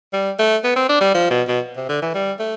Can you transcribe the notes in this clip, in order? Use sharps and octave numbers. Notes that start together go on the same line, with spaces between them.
G3
A3
B3
C4
D4
G3
F3
B2
B2
C3
D3
E3
G3
A3